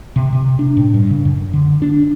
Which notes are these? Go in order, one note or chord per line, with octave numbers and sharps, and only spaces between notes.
C3
C3
D4
A2
G2
C#3
F#2
D3
D4